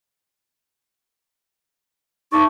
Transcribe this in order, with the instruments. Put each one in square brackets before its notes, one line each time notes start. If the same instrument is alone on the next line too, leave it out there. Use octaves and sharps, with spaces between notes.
[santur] A3 D5 [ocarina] D#4 [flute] C#6